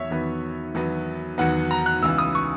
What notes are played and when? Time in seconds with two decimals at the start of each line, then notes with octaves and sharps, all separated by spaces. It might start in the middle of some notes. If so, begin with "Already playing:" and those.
Already playing: E2 D#3 F#3 C#5 E5
0.10 E2 D#3 F#3 B3
0.74 E2 D#3 F#3 B3
1.38 E2 D#3 F#3 B3 F#5
1.71 A#5
1.86 F#6
2.02 C#2 C#3 E3 B3 E6
2.18 D#6
2.35 C#6